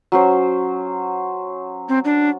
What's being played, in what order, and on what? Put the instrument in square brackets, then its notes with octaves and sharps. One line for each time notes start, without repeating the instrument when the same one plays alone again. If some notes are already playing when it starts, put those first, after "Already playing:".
[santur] F#3 C#4 C5
[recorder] C4
D4